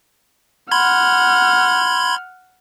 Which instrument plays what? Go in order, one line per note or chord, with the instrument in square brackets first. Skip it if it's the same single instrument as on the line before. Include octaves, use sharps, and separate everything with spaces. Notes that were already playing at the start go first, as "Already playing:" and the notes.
[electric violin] F#5 F6 [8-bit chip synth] B5 C6 G#6